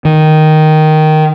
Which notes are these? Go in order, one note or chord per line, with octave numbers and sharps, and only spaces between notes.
D#3